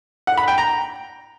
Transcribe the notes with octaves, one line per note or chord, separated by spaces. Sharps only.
F#5
B5
G5
A#5